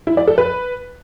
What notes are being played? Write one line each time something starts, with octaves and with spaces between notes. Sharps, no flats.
E4
D5
A4
B4